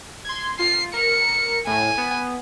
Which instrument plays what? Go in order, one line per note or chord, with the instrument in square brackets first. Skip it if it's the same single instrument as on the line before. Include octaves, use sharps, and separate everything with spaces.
[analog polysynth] C6 G#6
[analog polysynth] F4 [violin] C7
[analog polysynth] A#4 [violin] C#7
[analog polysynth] A2 [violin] G#5
[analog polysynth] B3